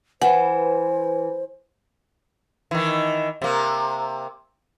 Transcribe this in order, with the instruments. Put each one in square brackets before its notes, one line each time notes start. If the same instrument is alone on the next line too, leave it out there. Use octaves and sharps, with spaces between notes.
[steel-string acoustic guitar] E3 [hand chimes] B4 G#5 [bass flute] C5 [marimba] F#5
[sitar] D#3 E3
C3 A#3